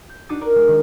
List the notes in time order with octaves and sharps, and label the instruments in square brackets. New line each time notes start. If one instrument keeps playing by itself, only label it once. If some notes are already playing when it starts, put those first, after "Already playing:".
[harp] G6
D4 D#4 F#4 D6 D#6 A6
A#4 D5
G#3
D#3